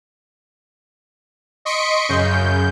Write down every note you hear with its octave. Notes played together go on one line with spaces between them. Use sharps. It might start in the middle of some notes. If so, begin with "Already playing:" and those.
D#5 C6 C#6 B6 C#7 D7
F#2 C#3 G6